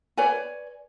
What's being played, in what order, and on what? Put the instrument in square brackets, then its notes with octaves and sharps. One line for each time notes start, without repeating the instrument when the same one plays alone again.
[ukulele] B4 C#5 D5 G#5